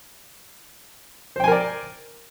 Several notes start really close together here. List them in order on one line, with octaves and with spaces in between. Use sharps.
C5 G5 G#5 A#4 D5